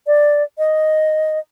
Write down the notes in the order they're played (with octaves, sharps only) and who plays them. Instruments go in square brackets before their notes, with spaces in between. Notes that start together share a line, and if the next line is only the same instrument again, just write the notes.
[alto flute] D5
D#5